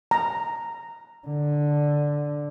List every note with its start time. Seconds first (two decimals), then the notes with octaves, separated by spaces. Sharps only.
0.11 A#5
1.27 D3